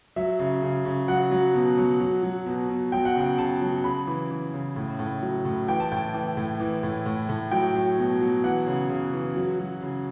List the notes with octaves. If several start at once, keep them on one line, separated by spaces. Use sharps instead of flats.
F#3 E5
C#3
C#3
C#3
F#3 F#5
F#3
B2
F#3
F#3
F#3
B2
B2
F#3 G5
F#5
C#3 G5
C#3 A5
F#3
C#3 B5
E3
E3
C#3
A2
A2
F#3
A2
E3 G5
A5
A2 G5
E3
A2
E3
A2
A2
A2
F#3 G5
F#3
B2
F#3
E3 F#5
C#3
C#3
E3
F#3
F#3
C#3